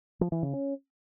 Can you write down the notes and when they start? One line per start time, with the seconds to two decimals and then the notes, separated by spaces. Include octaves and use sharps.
0.21 F3
0.32 E3
0.43 C#3
0.53 C#4